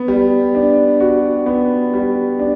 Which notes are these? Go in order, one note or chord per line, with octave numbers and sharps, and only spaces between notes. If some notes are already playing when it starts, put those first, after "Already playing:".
Already playing: B3
G3
D4
F#4
B3
G3
D4